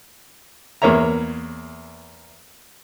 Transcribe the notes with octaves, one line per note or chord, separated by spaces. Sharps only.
E2 A#3 C#5 E5 A#5